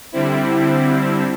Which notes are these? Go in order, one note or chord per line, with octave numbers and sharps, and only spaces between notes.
D3 G3 C4 E4